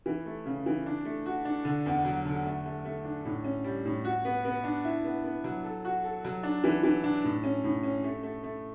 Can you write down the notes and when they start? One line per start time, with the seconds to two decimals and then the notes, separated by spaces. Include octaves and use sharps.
0.06 E3
0.26 A3
0.46 C#3
0.66 E3
0.86 D4
1.05 A3
1.26 F#4
1.45 D4
1.65 D3
1.86 E2
2.05 F#3
2.25 D3
2.45 A3
2.66 A3
2.85 A3
3.05 D4
3.25 A2
3.44 C#4
3.64 G3
3.85 A2
4.05 F#4
4.25 B3
4.45 B3
4.64 D4
4.85 E4
5.04 B3
5.24 B3
5.44 F#3
5.64 A4
5.85 F#4
6.04 A4
6.25 F#3
6.43 D4
6.64 E3
6.83 E3
7.04 D4
7.24 A2
7.43 C#4
7.64 A2
7.83 C#4
8.04 A3
8.23 A3
8.43 A3